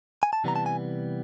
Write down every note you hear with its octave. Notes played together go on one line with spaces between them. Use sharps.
G#5
A5
C3 E3 G3 B3 A#5
A5
G#5